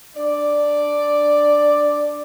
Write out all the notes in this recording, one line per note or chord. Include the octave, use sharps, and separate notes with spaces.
D4 D5